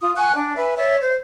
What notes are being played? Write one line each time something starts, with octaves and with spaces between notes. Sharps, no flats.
F4 D#6
F#5 G#5 C#6 F#6
D4 D5
B4 E5 G#5
C#5 D5 E5
C5